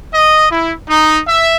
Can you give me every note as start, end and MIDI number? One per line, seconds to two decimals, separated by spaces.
0.13 0.45 75
0.50 0.72 64
0.87 1.19 63
1.26 1.56 76